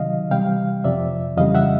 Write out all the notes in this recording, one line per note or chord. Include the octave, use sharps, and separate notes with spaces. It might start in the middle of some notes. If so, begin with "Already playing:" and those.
Already playing: C3 D#3 F#3 D#5 F5
C3 E3 G3 F5 G5
F2 C3 F3 D5 E5
F2 C#3 E3 G3 D#5 F5
E5 F#5